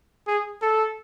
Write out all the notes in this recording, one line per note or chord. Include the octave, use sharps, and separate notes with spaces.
G#4
A4